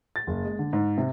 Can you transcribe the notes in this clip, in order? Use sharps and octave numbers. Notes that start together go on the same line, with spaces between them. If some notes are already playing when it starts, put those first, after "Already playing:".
A6
F#1
G#3
D3
G#2
C3